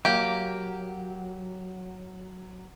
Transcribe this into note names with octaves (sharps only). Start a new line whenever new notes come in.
F#3 A#3 G4